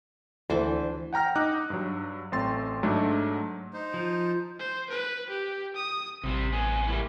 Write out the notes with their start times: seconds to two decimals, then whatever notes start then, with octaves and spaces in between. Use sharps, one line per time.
0.50 D2 E3 D4 C5
1.13 F#5 G5 A#5 F6 A#6
1.36 D#4 D6 F#6
1.70 G2 F#3
2.32 A1 A3 C4 C6 A6
2.83 G#2 F#3 A3 D4
3.73 D#4 C5
3.94 F3
4.59 C5
4.89 B4
5.30 G4
5.75 D#6
6.24 A1 C3 G3 C4
6.52 B3 G#4
6.87 G3 A#3 E4